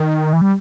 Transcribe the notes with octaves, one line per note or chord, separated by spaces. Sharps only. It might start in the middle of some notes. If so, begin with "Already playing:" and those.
Already playing: D#3
E3
G3